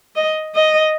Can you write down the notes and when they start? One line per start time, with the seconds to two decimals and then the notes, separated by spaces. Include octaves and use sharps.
0.16 D#5
0.55 D#5